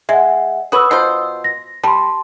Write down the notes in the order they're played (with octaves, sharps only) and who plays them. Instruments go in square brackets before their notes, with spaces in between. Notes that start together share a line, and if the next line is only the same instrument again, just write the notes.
[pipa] G#3 [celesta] E5 F#5
[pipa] F#4 B4 C#5 [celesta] D#6 E6
[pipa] B2 F4 C5
[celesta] A#6
[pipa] G3 [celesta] A5 C6